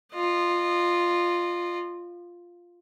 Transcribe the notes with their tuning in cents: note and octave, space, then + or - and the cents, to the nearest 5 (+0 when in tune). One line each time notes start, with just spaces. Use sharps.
F4 +0 D#5 -35